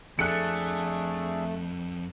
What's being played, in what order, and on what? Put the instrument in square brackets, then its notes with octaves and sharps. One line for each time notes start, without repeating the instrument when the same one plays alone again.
[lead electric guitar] F2 [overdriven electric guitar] A3 [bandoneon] D4 G#4 A4 [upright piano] F#6 C#7